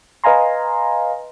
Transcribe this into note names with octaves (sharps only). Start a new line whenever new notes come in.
B4 D#5 F5 G#5 A#5 C6